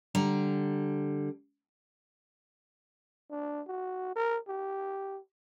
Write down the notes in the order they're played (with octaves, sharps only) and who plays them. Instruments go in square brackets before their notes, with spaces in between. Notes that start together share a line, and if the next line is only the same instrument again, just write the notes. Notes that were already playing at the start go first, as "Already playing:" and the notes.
[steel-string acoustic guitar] D3 G3 A#5
[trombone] D4
F#4
A#4
G4